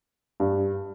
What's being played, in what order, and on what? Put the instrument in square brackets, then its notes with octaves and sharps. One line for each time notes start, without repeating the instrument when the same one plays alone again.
[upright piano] G2